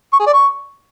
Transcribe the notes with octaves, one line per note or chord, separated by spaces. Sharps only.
C#6
G#4
D5
C#6